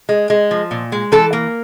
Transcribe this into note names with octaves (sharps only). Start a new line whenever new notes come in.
G#3
G#3
F3
A#2
G#3
E3 A4
A#3